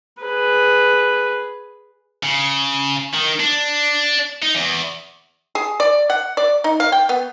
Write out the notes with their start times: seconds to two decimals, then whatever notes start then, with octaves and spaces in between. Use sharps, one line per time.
0.22 G#4 B4
2.23 C#3
3.14 D#3
3.40 D4
4.42 D#4
4.55 E2
5.55 G#4
5.80 D5
6.10 F#5
6.37 D5
6.64 D#4
6.80 F5
6.92 G5
7.09 B3